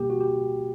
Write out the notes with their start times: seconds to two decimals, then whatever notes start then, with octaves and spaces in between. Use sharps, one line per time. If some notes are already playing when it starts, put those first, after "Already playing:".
Already playing: B2 G3 A#3 G4
0.10 F#4
0.21 G4